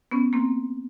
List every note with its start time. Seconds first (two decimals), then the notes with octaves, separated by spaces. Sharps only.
0.11 B3 C#4
0.33 A#3 C4